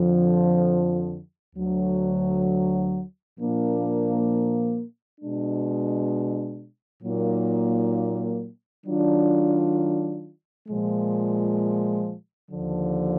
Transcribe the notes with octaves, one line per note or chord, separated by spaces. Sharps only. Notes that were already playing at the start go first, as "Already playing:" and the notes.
Already playing: F2 D3 F3
D2 D3 F#3
A#2 F3 A#3 D4
B2 G#3 D4
A#2 F#3 A#3 D#4
D#3 F#3 D4 F4
A#2 F3 G#3
D#2 D3 F3